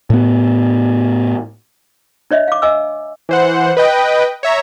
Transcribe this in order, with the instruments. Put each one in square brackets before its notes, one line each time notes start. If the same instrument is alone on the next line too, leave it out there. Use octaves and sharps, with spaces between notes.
[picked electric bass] A2 B3
[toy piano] D4 C#5 D#5 E5
F5 D6
D#5 G#5 D6 E6
[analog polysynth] E3 C5 F#5
B4 D#5 G5
C#5 E5 A#5